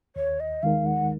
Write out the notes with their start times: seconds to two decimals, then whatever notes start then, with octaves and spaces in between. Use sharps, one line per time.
0.16 D#2 C#5
0.40 D#5
0.63 D#3 G#3 D#4 A#4 F5
0.86 F#5